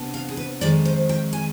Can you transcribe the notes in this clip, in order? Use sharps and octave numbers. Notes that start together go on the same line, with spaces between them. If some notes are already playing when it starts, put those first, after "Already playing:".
Already playing: C3 B3 D4
F5
G#4
B4
F2 D#3 G#3 D5
C5
G5
G#5